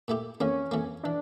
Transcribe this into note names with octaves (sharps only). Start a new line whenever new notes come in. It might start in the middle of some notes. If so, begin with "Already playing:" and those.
A#2 A3 E4 G4
F2 E3 A#3 C#4
F2 E3 A#3
E3 D4